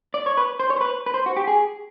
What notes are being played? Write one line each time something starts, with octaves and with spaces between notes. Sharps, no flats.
D5
C#5
B4
C5
C#5
C5
B4
B4
C5
F#4
G4
G#4